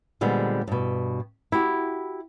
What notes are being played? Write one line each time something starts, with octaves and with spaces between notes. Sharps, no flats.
A#2 D3 G3 G#3 B3 C4
G2 B2
E4 F#4 G4